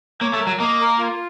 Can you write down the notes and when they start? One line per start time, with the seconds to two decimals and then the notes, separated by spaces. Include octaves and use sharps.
0.21 A#3 C#5
0.34 A3
0.40 A#4
0.47 F#3
0.60 A#3 D#5
0.80 A#4
0.99 F4